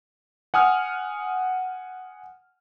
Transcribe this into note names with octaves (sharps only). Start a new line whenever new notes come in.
F#5 G#5 D#6 F6